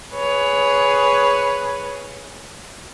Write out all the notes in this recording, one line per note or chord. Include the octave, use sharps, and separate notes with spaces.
G#4 B4 C#5